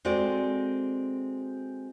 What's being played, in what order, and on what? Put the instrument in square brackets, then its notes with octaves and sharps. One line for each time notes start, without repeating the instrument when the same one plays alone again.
[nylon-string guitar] G#3 C4 F#4 A4 D5